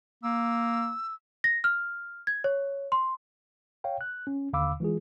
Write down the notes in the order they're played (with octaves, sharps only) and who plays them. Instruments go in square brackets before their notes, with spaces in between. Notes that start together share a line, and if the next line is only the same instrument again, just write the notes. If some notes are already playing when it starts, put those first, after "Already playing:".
[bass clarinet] A#3 [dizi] E6
[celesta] A#6
F6
G#6
C#5
C6
[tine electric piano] C#5 F5 G5
F#6
C#4
D#2 D3 F5 B5 D6 E6
E3 G#3 F4 G#4